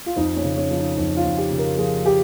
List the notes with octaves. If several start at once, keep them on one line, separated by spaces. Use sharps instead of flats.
F4
F2 D#4
C#4
C#3
C#4
F3
D#4
F2 D#4
F4
F2
G4
C#3
A#4
F3 G#4
G4